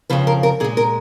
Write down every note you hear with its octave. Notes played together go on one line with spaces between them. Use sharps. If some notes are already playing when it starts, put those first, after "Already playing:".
F2 C#3 F3 B4
A#4
A#4
A#2 G#3 G#4
A#4